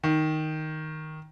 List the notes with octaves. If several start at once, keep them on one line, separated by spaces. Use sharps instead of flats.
D#3